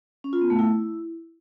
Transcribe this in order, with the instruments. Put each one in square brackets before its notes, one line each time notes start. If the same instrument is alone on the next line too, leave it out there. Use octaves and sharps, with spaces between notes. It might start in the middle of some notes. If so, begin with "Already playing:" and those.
[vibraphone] C#4
F4
B3
A3
E4